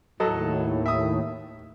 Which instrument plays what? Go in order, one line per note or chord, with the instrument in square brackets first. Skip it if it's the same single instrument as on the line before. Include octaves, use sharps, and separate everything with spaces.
[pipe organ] D#2 A2 [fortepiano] F#3 A4 D#5
[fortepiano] E5 D#6